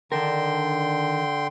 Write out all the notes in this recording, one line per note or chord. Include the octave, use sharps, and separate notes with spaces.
D3 D#3 D4 A#4 G5 C6